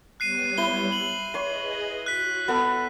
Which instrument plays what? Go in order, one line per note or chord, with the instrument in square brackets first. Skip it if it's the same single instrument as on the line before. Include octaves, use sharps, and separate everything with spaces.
[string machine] G3 B3 C#5 [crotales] F#6 C7 D#7
[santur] E4 C5 [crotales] G7
[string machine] C7 [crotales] F#7
[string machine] G#4 B4 D#5 [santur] C#5 C6
[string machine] F#4 [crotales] F#6 B6
[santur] B3 A4 F#5